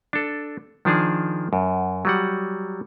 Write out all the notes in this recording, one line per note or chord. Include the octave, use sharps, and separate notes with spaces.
D4 A4
D#3 F3 D4 G#4
F#2
F#3 G3 F#5